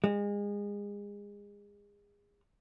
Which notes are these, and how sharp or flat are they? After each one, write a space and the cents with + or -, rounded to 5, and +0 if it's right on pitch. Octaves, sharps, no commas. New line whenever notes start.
G#3 -30